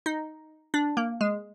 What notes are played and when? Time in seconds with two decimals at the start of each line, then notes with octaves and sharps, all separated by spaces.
0.06 D#4
0.74 D4
0.97 A#3
1.21 G#3